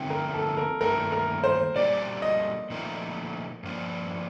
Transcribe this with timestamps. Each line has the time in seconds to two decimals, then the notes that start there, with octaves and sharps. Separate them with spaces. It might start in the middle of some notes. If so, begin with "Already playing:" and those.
Already playing: F2 D3 A3 C4 D#4 G5
0.10 A#4
0.34 A4
0.57 A#4
0.81 G2 D#3 A3 A#4
1.12 A#4
1.44 C5
1.76 A#2 G3 D4 G4 A#4 D5
2.22 D#5
2.70 A#2 F3 A3 D#4 A#4
3.63 G2 F3 A#3 D4